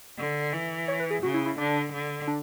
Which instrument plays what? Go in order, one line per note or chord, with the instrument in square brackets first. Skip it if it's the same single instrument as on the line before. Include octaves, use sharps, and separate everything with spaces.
[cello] D3
E3
[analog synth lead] C#5
B4
G#4
[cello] C#3 [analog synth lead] F#4
[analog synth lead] E4
E4
[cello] D3 [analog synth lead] D4
[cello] D3
[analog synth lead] D4